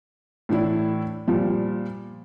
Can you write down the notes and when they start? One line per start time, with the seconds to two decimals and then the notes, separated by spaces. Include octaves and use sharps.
0.49 A2 E3 D4 E4
1.28 A#2 F3 G3